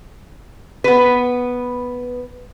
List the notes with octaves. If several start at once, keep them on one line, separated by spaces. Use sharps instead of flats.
B3 B4